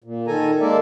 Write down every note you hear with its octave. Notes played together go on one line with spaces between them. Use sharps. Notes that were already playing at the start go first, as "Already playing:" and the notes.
A#2
D#3 A4 G#5 A#5
G#3 A#3 A4 A#4 D5 E5